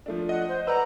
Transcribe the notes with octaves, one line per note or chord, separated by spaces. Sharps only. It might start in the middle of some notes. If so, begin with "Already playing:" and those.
F3 A3 D4
D#5 F#5
C5
B4 D5 F#5 A#5 E6